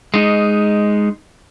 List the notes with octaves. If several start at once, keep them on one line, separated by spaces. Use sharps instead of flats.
G#3 D#4